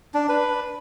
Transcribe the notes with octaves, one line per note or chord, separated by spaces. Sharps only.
D4
B4